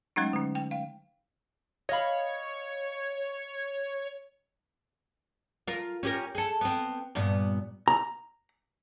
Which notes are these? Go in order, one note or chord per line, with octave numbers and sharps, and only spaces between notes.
F#3 G#3 A3 C#4 D#4
D3 C#4
G5
F5
C#5 D#5 F5 B5
F4 A#4
C#4 G4 A#4
G#4 A4
B3 C4
G2 A#2 B3
A#5